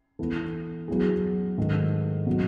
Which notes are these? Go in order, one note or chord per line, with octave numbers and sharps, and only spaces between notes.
E3 B3 E4 A4
F#3 B3 E4 G#4
G#2 D#3 A3
B2 F#3